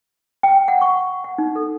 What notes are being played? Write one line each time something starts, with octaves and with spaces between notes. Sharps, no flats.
G5
F#5
C#6
F#5
D#4
A4